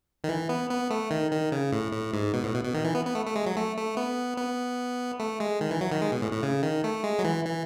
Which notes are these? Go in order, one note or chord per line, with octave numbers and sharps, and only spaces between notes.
D#3
E3
B3
B3
A3
D#3
D#3
C#3
A2
A2
G#2
B2
A2
B2
B2
D#3
E3
B3
B3
A3
A3
G#3
F#3
A3
A3
B3
B3
A3
G#3
D#3
E3
F#3
D#3
G#3
B2
A2
A2
C#3
D#3
A3
G#3
F#3
E3
E3